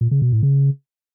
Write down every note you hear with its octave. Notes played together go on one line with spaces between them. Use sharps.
A#2
C#3
B2
A2
C#3